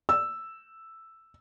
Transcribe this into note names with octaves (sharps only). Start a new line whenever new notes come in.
E6